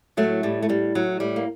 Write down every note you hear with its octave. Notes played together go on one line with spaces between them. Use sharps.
A2 F#3 A3
A2 G3
A3
A2 G3
A2 F#3
A2 G3
A#3